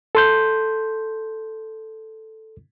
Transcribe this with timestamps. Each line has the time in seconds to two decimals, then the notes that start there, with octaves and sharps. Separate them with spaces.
0.15 A4 C6 G6